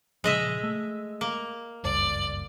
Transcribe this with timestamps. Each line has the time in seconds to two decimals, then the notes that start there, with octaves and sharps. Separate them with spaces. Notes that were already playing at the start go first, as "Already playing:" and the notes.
0.24 A#2 C#3 F3 G#3 D#5 E5
0.63 A3
1.21 A#3
1.84 F#1 C#2 G2 D5